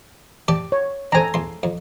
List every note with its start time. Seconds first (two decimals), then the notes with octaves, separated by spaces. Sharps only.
0.48 G4 D5 A5 D6
0.72 C#5
1.12 C4 D4 A4 G#5 A#5
1.34 E2 C6
1.63 F2